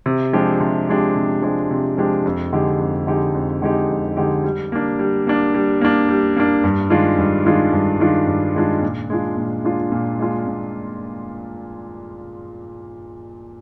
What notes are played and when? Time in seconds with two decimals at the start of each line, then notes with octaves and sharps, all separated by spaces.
0.06 C3
0.33 F3 G#3 D4 G4
0.61 C3
0.88 F3 G#3 D4 G4
1.15 C3
1.42 F3 G#3 D4 G4
1.71 C3
1.97 F3 G#3 D4 G4
2.26 F2
2.53 D3 G#3 D#4 G4
2.79 F2
3.07 D3 G#3 D#4 G4
3.35 F2
3.62 D3 G#3 D#4 G4
3.89 F2
4.17 D3 G#3 D#4 G4
4.44 G3
4.72 A#3 D4
4.99 G3
5.27 A#3 D4
5.54 G3
5.81 A#3 D4
6.09 G3
6.36 A#3 D4
6.64 G2
6.90 D#3 G#3 D4 F4
7.18 G2
7.45 D#3 G#3 D4 F4
7.73 G2
8.00 D#3 G#3 D4 F4
8.27 G2
8.55 D#3 G#3 D4 F4
8.82 A#2
9.10 G#3 D4 F4
9.37 A#2
9.64 G#3 D4 F4
9.92 A#2
10.20 G#3 D4 F4
10.47 A#2